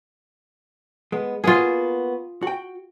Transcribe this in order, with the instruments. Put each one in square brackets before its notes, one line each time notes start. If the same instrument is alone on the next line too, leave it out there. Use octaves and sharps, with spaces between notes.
[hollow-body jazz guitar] G#3 B3
[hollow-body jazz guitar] A#3 B3 F#4 [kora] F4 G#4
[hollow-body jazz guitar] F#4 G5